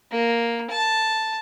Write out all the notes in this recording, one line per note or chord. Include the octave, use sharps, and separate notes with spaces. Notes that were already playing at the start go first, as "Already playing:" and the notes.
A#3
A5